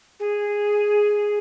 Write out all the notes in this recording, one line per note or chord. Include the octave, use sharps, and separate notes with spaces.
G#4